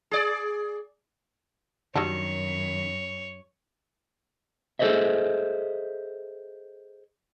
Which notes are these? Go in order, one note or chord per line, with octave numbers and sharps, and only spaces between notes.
G#4 D5
F#2 D#3 F#3 G3 D4 C#5
G#4 A4 C5 C#5 D#5 E5